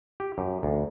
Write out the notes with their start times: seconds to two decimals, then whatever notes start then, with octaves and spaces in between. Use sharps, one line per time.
0.20 G4
0.38 F#2
0.63 D2